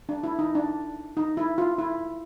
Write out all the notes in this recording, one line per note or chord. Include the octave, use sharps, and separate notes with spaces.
D4
E4
D#4
D4
D#4
E4
F4
E4